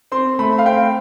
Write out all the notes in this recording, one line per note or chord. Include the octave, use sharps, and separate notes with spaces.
C4 C6
A3 B5
F5
C4 G5